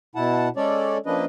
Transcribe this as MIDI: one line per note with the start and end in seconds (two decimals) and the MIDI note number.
0.15 0.49 47
0.15 0.49 64
0.15 0.49 78
0.15 0.49 81
0.56 0.98 56
0.56 0.98 61
0.56 0.98 69
0.56 0.98 73
0.56 0.98 74
1.06 1.25 53
1.06 1.25 58
1.06 1.25 61
1.06 1.25 62
1.06 1.25 71
1.06 1.25 75